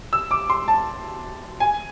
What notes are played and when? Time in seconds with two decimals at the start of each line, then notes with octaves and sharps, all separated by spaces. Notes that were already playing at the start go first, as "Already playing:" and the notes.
0.13 E6
0.31 D6
0.50 C6
0.68 A5
1.60 G#5